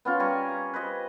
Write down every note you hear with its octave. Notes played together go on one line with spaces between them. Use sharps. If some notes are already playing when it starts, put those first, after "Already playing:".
B3 C#4 F4
G3 G#5 A#5 C#6
A#5
B4 C5 D#5